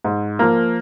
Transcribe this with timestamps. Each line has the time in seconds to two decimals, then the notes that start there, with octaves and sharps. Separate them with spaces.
0.05 G#2
0.39 F3 A#3